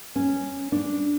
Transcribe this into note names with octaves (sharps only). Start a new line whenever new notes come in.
C#4
D4